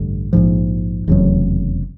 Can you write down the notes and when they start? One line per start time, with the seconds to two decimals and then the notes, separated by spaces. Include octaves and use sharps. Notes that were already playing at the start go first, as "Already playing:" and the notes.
Already playing: A1 G2 D3
0.33 A#1 G#2 F3
1.08 F1 E2 C#3 F#3